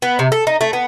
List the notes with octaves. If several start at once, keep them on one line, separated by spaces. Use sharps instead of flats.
B3
C3
A4
D#4
A3
B3